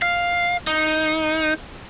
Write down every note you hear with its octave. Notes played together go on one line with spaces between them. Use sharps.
F5
D#4